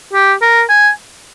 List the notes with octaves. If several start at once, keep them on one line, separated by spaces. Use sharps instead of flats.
G4
A#4
G#5